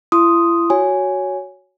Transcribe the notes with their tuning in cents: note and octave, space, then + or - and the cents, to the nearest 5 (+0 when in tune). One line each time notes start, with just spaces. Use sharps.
E4 +40 C6 +0 D#6 +0
F#4 +0 C#5 +10 G#5 +0